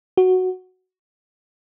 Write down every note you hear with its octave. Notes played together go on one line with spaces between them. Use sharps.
F#4